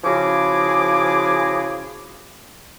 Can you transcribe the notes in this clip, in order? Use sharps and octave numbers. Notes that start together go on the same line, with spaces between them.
C#3 F3 E4 F#4 G#4 D6